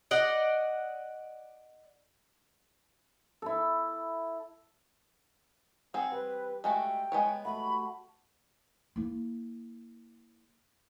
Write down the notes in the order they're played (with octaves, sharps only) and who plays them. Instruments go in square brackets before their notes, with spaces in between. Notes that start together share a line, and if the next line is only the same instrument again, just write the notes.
[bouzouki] D5 D#5 F#5
[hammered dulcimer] E4 A4
[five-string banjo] C4 G#4 [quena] F#5
[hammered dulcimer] G3 [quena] B4
[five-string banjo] G#3 A3 F#4 [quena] G5
[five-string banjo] G#3 B3 C#5
[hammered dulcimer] A3 F#4 [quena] B5
[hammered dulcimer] G4
[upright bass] A#3 E4